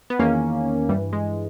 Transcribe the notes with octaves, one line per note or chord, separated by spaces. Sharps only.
B3
E2 D#3 A#3 C#4
G2 E3 G3
G#3